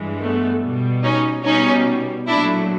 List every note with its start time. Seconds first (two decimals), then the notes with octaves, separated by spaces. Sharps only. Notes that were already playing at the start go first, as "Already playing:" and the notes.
Already playing: G2 E3 G#3
0.20 A3 B3
0.61 B2 G3
1.03 C#4 D#4
1.44 B2 G3 C#4 D#4
2.27 A#2 F#3 A3 D4 E4